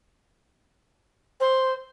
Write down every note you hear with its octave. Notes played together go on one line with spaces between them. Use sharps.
C5